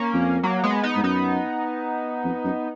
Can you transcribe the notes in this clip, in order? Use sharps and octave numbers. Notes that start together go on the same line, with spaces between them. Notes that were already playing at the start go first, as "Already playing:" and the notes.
Already playing: A#3 C#4
F2
F#3 A#3
G#3 B3
B3 D#4
G#2
F#2 B3 D#4
F2
F#2